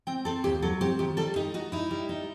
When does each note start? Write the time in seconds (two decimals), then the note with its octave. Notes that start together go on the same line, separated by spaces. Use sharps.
0.07 C4 G5
0.25 C4 A4
0.44 D#2 G4
0.62 F#3 A4
0.81 C4 G4
0.99 D#3 G4
1.17 G3 A4
1.36 D#4 G4
1.54 D#4 F#4
1.72 D#4 E4
1.91 G3
2.09 D#4